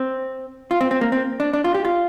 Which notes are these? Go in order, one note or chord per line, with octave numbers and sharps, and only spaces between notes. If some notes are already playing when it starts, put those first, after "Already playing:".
Already playing: C4
F4
C4
C4
A#3
C4
D4
D4
F4
G4
F4